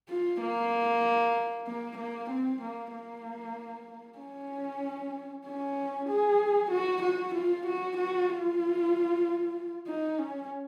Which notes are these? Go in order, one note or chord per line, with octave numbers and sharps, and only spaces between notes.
F4
A#3
A#3
A#3
C4
A#3
A#3
C#4
C#4
G#4
F#4
F#4
F4
F#4
F#4
F4
D#4
C#4